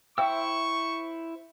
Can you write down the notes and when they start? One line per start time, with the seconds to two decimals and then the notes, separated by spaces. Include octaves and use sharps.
0.18 E4 C5 E5 F5 G5 C#6 E6